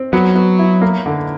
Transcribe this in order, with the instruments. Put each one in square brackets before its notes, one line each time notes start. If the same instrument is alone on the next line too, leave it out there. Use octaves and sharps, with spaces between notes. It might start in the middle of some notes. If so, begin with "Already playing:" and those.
Already playing: [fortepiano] C4
[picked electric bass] F#3 [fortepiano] B3
[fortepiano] B3
E4
A#3
D3